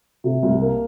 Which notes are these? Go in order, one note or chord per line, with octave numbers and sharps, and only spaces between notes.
C3
C2
A#3